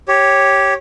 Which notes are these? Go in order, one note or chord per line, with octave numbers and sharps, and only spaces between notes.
G4 C#5